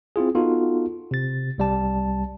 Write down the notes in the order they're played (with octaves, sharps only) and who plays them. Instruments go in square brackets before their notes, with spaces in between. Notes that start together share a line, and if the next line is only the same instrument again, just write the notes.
[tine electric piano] C4 E4 F4 G#4
B3 D#4 F4 F#4 A4
C3 A6
C2 G3 A5